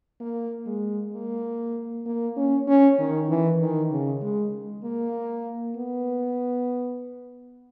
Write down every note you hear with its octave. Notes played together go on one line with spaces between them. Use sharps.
A#3
G#3
A#3
A#3
C#4
C#4
D#3
E3
D#3
C#3
G#3
A#3
B3